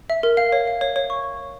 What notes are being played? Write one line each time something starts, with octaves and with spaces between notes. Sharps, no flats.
E5
A#4
F5
C#5
F5
C#5
C#5
C#6